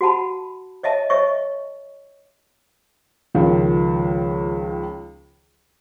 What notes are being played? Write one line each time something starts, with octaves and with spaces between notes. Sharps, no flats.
F#4 F#5 A5 B5
C#5 D#5 E5 A5
C#5 D#5 E5 C#6
C#2 D#3 F3